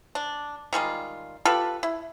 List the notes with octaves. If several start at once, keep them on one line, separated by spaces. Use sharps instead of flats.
D4
D#3 G3 G#3 F4
F4 G4 A4 B4
E4